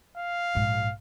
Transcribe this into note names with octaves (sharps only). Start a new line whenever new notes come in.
F5
A#1 G#2